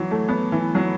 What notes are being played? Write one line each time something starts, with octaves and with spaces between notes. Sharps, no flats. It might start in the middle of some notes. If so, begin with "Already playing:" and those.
Already playing: E3 F#3
A3
B3
E3
F#3